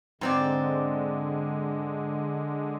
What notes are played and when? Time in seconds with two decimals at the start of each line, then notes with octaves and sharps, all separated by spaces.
0.21 G#2 D3 G#3 C4 D5